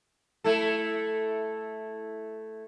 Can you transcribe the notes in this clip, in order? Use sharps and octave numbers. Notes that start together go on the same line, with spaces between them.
A3 E4 A4